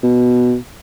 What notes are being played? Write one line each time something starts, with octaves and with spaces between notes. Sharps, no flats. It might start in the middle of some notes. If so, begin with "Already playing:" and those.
B2